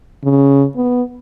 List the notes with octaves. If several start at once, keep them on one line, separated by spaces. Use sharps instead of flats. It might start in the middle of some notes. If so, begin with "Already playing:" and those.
C#3
B3